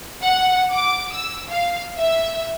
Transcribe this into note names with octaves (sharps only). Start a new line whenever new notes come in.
F#5
D6
E6
F5
E5